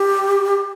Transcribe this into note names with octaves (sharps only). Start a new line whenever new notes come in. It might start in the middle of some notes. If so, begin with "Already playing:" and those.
Already playing: G4